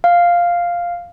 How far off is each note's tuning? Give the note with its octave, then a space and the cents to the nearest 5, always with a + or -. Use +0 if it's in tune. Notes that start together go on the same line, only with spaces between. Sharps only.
F5 +0